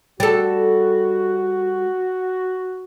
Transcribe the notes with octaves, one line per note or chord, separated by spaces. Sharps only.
G3 F#4 A4